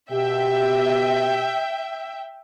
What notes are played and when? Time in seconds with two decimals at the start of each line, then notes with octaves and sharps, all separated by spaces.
0.11 B2 G4 E5 G5